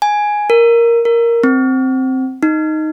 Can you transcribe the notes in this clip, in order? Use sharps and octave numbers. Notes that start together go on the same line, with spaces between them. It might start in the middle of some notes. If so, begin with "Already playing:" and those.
G#5
A#4
A#4
C4
D#4